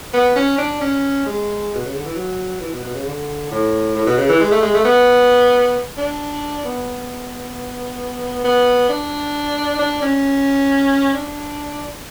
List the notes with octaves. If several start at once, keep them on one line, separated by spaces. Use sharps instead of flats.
B3
C#4
D4
C#4
G#3
B2
C#3
D3
E3
F#3
E3
B2
B2
C#3
D3
A2
A2
B2
C#3
E3
G#3
A3
G#3
A3
B3
D4
B3
B3
D4
D4
C#4
D4